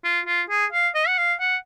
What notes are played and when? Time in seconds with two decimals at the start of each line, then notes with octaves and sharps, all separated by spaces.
0.04 F4
0.26 F4
0.50 G#4
0.73 F5
0.95 D#5
1.08 F#5
1.18 F5
1.40 F#5